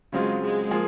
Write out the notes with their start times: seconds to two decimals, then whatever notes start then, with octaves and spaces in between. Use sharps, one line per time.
0.12 C#3 F#3 G#3 C4 F4
0.41 G#3
0.71 F3 A#3 F4 G#4